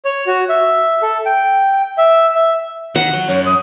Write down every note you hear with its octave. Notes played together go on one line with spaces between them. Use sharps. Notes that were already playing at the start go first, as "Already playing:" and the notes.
C#5
F#4
E5
A4
G5
E5
E5
D#3 F#5
F#4 C#5
F#2 C#5
D#6